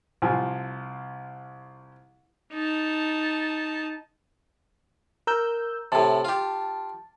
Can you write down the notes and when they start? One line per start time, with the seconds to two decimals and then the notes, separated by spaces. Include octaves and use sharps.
0.22 C2 F3 G#5
2.53 D#4 A5
5.27 A#4 E6 G6
5.92 A2 C3 A5
6.25 F4 G4